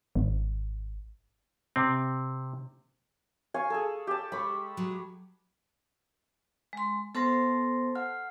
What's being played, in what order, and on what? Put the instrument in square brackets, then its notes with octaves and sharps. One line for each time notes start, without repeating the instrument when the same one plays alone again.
[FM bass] G#1
[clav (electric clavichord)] C3 C4
[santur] F5 G#5 C#6
G#4 A4
G4 A5
[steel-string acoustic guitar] G#3 [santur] B5 C#6
[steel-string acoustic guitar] F#3 G#3
[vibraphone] G#3 C6
[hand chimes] B3 C6 A#6 [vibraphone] A4 C5 A5
[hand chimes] F#5 F6